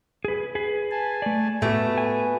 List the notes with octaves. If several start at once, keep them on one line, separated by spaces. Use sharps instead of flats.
G#4 B4
G#4 B4
G#5 A5
A3 D5
A2 A3 B3 F#4 G4 B4
G#5